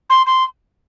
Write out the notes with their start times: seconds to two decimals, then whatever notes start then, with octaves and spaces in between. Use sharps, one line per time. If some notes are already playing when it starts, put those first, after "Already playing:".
0.10 C6
0.26 C6